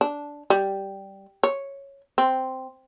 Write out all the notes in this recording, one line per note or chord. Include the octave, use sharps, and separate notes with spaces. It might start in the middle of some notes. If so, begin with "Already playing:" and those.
D4
G3
C#5
C4